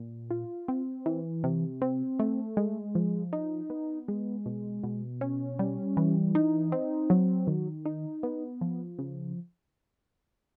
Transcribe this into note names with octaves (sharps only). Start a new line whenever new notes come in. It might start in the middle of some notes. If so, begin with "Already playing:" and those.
Already playing: A#2
F4
C4
E3
C3
C4
A3
G#3
F3
D#4
B3
G#3
B2
B2
C#4
G3
E3
D#4
C4
F#3
D#3
D#4
B3
F3
C#3